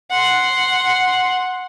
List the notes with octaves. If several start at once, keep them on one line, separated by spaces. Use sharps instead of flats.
F#5 C6